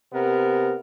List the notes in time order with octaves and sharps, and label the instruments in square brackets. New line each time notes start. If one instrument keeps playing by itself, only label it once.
[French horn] C3 [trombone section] B3 A#4